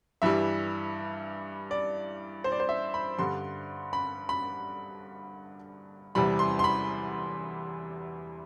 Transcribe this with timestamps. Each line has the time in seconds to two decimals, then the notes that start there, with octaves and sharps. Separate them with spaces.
0.22 G2 E3 G3 E5
1.71 D5
2.44 C5
2.52 D5
2.60 C5
2.69 E5
2.94 B5
3.18 G2 D3 G3 C6
3.93 B5
4.29 B5
6.15 E2 C3 E3 G3 B5
6.39 C6
6.59 C6
6.64 B5